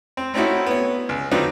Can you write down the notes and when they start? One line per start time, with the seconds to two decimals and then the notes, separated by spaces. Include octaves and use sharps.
0.17 C4
0.34 A3 C4 C#4 D#4 E4 F#4
0.66 B3 C#5
1.09 C#2
1.31 D3 F#3 C4 D#4 F4 B4